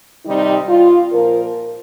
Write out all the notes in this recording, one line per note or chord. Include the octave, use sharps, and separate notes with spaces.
C3 D#3 G3 D#4
F4
A#2 F3 A#4